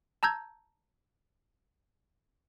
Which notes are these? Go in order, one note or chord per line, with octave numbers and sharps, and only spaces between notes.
A5 A#5 E6 G6 G#6